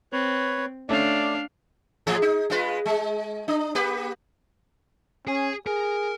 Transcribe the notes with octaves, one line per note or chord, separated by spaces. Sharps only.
C4 B4 C#5
A3 C#4 D4 D5 F5
A2 F3 G#4
D#4
G#3 F4 B4
G#3
D4
A#3 G4 B4
C#4 G#4 G#5
G#4 A#4